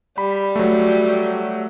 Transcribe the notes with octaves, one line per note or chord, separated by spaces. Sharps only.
G3 B5
F#3 A3